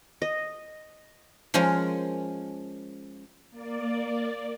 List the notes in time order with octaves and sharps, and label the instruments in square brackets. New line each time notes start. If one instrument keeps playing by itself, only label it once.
[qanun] D#5
[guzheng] F3 G#3 C#4 A#4
[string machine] A#3 D5